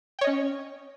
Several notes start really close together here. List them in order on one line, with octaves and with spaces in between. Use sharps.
G5 C#5 D#5 C#4